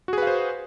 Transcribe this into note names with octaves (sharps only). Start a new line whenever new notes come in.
F#4 G#4 B4 C5 F5